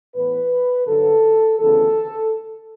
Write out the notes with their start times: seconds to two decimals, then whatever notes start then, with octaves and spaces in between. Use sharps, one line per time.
0.14 A2 E3 B3 B4
0.86 G2 D3 F#3 A4
1.59 D2 C#3 E3 B3 A4